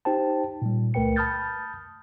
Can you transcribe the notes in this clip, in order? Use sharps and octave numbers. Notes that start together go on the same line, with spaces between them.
D#4 G4 C5 G5 A5
A#2 G3
C#2 A3 A#4 B4 G5 C#7
A5 B5 D#6 F6 G6 A6